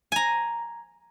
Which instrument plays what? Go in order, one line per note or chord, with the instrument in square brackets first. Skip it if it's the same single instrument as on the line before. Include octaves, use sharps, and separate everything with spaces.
[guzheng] G#5 A#5